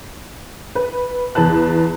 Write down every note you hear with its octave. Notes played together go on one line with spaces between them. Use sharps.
B4
E2 B4 A5 F#6